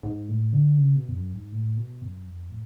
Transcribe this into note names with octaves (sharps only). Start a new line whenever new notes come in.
G#2
A2
D3
C#3
B2
F2
F#2
G#2
A2
B2
F#2
F2
A2